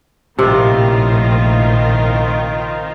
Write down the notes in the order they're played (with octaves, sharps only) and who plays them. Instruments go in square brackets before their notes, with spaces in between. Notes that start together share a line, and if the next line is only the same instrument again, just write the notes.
[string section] A#1 A2 [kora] C3 [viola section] D#3 C4 F4